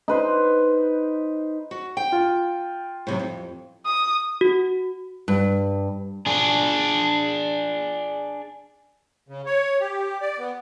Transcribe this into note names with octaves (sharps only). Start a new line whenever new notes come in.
D#4 B4 C5
F#4
G5
F4
A2 C3 F#3
F2
D#6
F#4
G2
D4 G#4
C#3
C#5
G4
D5
B3